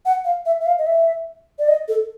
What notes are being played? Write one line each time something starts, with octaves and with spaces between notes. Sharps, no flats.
F#5
F5
E5
E5
F5
D#5
E5
D5
D#5
A4